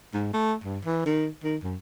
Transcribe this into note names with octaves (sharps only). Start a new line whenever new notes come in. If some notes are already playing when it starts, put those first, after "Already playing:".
G#2
A3
G2
E3
D#3
D#3
F#2